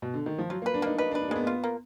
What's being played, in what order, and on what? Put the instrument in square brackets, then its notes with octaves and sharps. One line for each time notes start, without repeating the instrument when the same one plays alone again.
[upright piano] B2
D3
D#3
F3
[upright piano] F#3 [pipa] F4
[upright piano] A#3
[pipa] B4
[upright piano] D4
[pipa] A#3 [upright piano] D#4
[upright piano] D#4 [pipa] B4
[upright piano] D4
[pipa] B4
[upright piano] D4
A#3
[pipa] G#3 [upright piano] B3
[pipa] F4
A#3